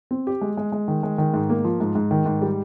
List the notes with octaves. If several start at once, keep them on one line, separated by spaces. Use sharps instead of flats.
C4
G4
G#3
G#3
G#3
D#3
G#3
D#3
G#2
A#3
F3
G#2
G#2
D#3
G#2
G3